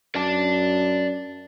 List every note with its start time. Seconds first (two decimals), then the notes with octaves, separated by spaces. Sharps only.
0.15 F#2 D5 A5